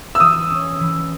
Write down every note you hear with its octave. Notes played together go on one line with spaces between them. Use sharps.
E6
E3 D#6
C#4
E3